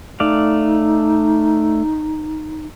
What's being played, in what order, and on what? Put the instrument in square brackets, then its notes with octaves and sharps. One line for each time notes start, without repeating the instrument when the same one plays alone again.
[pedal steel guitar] A3 D5 F5 [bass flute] D#4